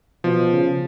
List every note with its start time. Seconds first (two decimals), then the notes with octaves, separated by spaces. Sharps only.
0.24 B2 F3
0.52 C#3